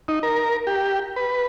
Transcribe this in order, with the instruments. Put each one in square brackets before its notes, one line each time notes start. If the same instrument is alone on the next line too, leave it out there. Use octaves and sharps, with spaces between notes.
[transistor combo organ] D#4
A#4
G4
B4